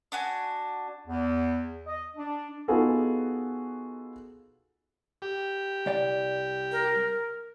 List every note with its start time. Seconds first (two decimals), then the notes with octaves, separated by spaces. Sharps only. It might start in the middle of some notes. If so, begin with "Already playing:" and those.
0.12 D4 F#4 G#5
1.07 E2
1.86 D#5
2.16 D4
2.68 B3 D#4 F4 F#4 G#4 A4
5.22 G4
5.86 C2 D5 G5
6.72 A#4